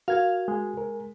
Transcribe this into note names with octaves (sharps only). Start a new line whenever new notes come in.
F#4 A#4 F5 G#6
G#3
A#4